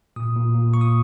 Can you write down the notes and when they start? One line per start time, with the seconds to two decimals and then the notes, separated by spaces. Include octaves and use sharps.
0.16 A#2 D#6
0.36 A#2
0.54 A#2
0.74 A#2 C#6
0.81 D#6